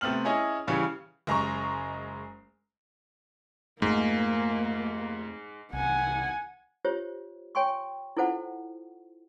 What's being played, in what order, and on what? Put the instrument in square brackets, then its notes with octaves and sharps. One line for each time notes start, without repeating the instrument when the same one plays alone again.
[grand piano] C3 A3 B3 C4 F6 F#7
C#4 E4 G#4 C#5 D#5
C#3 E3 G3 C#4 F5 C#6
[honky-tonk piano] F#1 G#3 A#5 C#6
[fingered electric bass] F2 A3 [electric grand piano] G#2 [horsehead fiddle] A#3
[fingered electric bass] C2 [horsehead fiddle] F#5 G#5
[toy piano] F4 G4 C5 C#5
C#5 G5 G#5 C6 C#6
E4 F4 A4 C5 F#5